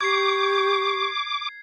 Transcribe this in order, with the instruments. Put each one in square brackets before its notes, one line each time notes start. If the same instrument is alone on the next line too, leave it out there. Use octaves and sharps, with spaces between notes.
[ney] G4 [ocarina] C#6 [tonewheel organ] D6 [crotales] G#6 C7